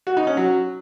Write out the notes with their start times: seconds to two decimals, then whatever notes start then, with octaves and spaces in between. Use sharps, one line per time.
0.07 F#4
0.17 D#4
0.27 C#4
0.37 F#3